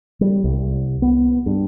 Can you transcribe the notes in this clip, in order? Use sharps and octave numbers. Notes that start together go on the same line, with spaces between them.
G3
C2
B3
G2